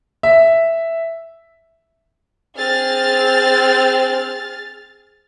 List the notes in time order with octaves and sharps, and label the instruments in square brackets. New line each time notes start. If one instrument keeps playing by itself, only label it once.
[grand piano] E5
[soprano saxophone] C4 [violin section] G#4 F6 A6